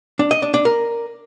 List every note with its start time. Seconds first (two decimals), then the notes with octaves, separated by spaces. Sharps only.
0.19 D4
0.31 D#5
0.42 D4
0.54 D4
0.65 A#4